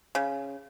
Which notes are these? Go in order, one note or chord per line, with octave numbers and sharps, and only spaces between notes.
C#3